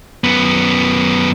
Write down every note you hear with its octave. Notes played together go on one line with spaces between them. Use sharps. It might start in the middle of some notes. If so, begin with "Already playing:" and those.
F#2 B3